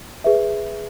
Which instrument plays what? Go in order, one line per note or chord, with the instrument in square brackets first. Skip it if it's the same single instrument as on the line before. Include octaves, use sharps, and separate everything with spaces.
[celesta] G#4 B4 E5